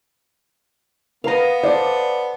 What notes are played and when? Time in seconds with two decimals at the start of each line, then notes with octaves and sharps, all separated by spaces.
1.24 B3 A#4 B4 D#5 F5 A#5
1.63 A4 C5 D5